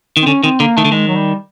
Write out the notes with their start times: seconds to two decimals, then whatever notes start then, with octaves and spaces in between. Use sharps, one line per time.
0.17 D#3
0.22 C4
0.26 D3 C#4
0.43 D#3 C4
0.60 D3 A#3
0.77 D#3 A3
0.85 D3
0.92 D#3 G#3
1.08 F#3
1.16 G3